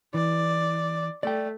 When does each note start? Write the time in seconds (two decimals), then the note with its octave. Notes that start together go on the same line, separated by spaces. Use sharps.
0.14 E3 D5
1.23 A3 D5 G5